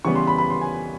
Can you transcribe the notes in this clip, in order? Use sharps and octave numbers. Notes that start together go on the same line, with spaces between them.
C#3 E3 G3 B3 C#6
C6
B5
B5
C6
G#5